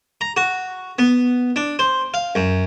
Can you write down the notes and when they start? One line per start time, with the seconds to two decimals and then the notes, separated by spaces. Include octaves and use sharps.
0.21 A#5
0.37 F#4
0.99 B3
1.56 D4
1.79 C5
2.14 F5
2.35 F#2